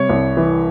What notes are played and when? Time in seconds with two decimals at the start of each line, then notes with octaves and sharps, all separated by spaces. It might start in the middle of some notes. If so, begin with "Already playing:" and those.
Already playing: C3 G3 C#5
0.09 C2
0.37 E3